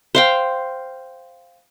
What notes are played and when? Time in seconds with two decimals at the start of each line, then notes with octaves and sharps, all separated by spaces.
0.15 C5 F5 G5